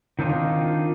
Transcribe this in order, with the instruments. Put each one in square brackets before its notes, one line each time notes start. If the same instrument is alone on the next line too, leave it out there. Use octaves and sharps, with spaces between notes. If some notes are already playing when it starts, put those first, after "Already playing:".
[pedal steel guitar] D#3 C4 D4 D#4 F4